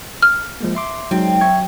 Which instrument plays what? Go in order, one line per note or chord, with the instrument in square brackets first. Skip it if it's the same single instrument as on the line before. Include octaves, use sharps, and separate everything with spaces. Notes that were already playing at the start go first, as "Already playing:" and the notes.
[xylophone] F6
[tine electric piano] F3 G#3 A#3
E5 C6 D6
[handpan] F#3 [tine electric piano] G#3 D#4 C5 [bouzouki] C4
[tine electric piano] E5 C#6 G#6